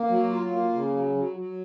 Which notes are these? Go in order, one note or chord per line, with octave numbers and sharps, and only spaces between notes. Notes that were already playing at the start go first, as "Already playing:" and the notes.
Already playing: A#3
F#3
F4
A#3
C#3
F#3
F#3
F#3